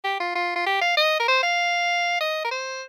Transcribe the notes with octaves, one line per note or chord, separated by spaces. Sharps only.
G4
F4
F4
F4
G4
F5
D#5
A#4
C5
F5
D#5
A#4
C5